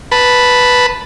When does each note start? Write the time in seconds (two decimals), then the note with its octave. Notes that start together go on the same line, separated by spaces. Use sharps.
0.12 B4 A5 B5